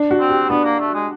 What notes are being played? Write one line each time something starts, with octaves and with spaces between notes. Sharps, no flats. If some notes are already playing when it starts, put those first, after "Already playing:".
Already playing: D4
F#4
C4
G4
B3 D4
A#3
A3
G#3